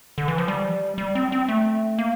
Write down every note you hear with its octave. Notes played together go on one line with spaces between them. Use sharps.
D3
E3
F3
G3
G3
C4
C4
A3
A#3